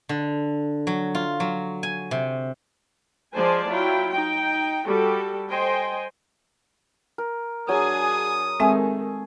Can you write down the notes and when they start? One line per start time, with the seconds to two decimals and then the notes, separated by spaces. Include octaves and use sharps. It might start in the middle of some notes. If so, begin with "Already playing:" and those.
0.09 D3
0.87 F#3
1.15 F4
1.40 F#3
1.83 G#5
2.11 C3
3.35 F3 G#3 C5 D5 G#5 A5
3.67 F#3 E4 F4 G5
4.10 D#4 G5
4.85 G3 F#4 G4 A4
5.50 C5 D#5 G5 G#5
7.18 A#4
7.69 F#3 D4 G#4 G#5 D#6
8.60 D#3 G#3 A3 C4 G#4 E5 G#5